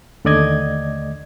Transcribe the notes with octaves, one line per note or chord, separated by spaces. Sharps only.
D#2 D3 A3 D5 D#5 G#6